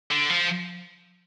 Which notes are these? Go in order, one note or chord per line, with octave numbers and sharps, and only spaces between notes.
D3
F3